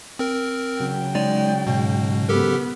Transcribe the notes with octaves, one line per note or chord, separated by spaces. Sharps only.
C4 A#4
C#3 F#3 G5
G#3 D#4 C#5 D5
G#2 B2
B3 G4 A4 A#4